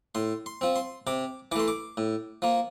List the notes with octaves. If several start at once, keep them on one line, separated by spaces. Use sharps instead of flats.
A2 C6
C6
F3 C4
C6
C3 D6
E3 A3 C6 D6
D6
A2
F3 A#3